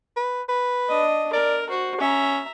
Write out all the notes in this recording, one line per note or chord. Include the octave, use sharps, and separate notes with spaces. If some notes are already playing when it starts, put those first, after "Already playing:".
B4
B4
D4 D#5
A#4 D5
F#4 C5
C#4 E5 A#5